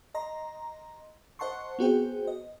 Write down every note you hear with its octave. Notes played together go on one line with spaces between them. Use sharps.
D#5 A#5 C6
C5 D#5 F#5 A5 C6 C#6
B3 C4 F#4 G#4 C5 G5
D#5